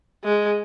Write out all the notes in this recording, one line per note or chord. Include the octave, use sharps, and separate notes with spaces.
G#3